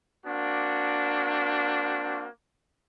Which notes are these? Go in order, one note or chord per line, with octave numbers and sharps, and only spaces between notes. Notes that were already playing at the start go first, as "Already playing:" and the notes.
A#3 C4 D4 F#4